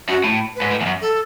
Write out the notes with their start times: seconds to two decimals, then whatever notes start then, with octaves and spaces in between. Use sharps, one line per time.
0.09 F#2 F#4
0.24 A2
0.56 B4
0.61 G#2
0.71 A2
0.81 E2
0.86 F#2
1.02 A4